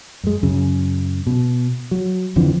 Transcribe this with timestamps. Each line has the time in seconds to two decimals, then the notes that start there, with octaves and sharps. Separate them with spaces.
0.23 F#2 G#3
0.43 F#2 C#3
1.27 B2
1.91 F#3
2.36 F2 D3 E3 F3